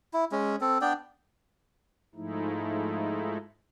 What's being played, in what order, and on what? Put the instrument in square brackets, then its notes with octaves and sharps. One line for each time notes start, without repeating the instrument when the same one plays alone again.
[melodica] E4
G#3 C#4
C4 A4
B3 D4 D5 G5
[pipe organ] G#2 F3 G#3 A3 D#4 E4